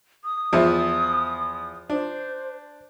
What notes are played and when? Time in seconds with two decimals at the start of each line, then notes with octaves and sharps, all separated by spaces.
0.24 D#6
0.53 E2 F3 E5
1.90 D4 C5